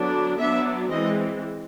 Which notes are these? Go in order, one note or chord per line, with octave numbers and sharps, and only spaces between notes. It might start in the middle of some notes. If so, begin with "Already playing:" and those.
Already playing: D3 F#3 B3 D4
F#3 B3 D4 E5
E3 G#3 C4 D#5